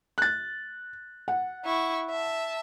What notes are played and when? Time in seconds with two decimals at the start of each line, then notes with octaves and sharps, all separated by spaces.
0.18 F#6 A6
1.28 F#5
1.65 E4 C#6
2.10 E5 A5